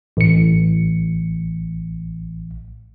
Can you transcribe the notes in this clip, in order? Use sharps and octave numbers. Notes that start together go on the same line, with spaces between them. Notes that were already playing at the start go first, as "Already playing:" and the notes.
A1 C#7